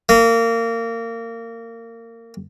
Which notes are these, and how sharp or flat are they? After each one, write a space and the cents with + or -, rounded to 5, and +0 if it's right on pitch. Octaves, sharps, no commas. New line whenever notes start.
A#3 -25